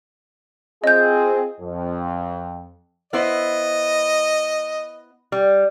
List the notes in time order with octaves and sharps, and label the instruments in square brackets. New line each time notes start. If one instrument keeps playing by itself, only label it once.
[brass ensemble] C4 F4 G#4 [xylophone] D#5 G6
[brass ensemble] F2
[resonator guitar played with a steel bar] B3 E4 C5 [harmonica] D#5
[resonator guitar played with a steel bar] G3